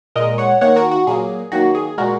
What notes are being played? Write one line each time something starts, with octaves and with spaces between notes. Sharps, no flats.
A#2 G#3 A#4 D#5
C#5 F#5
D#3 A#3 C#5 F#5
F#4 A#4
F#4
A#2 F#3 A#3 G#4
D#3 F#3 A#3 F#4
G#4
A#2 G#3 F#4 A#4